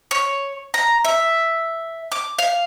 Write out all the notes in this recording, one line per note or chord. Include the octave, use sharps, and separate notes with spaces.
C#5
A#5
E5
D6
F5